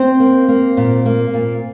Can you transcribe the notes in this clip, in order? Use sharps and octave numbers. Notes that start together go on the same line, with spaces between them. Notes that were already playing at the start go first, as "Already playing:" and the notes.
Already playing: C4 C5
A#3
A#3
A#2
A#3
A#2